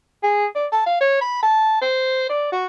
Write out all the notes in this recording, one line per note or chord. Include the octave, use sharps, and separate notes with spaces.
G#4
D5
A5
F5
C#5
B5
A5
C5
D5
F#4